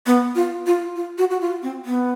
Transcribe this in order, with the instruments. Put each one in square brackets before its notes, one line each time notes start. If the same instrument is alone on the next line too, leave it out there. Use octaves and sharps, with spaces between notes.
[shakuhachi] B3
F4
F4
F4
F#4
F#4
F4
C4
B3